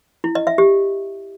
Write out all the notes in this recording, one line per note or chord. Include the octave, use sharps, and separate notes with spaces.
E4
D#5
E5
G4